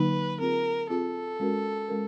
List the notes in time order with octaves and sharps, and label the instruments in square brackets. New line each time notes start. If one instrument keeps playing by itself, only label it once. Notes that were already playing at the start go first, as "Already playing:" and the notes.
Already playing: [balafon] D3 F#3 A#3 D#4 [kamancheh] B4
[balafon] C4 F4 G#4 [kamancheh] A#4
[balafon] C4 F4 G#4 [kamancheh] A4
[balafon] G#3 C#4 F#4 A#4
G#3 C#4 F#4 A#4